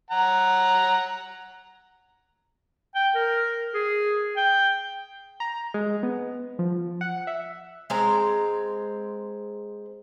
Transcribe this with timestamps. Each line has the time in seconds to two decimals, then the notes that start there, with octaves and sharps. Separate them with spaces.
0.10 F#5 A#5
2.95 G5
3.15 A#4
3.74 G#4
4.37 G5
5.40 A#5
5.74 G#3
6.03 B3
6.59 F3
7.01 F#5
7.27 E5
7.90 G#3 C4 A#5